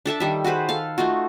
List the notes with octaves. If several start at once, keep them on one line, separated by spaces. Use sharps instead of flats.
D4 A4 E5 A5
D#3 G3 E5
F#4 G#4 B4 C5
A4 F5
A3 D#4 F4 F#4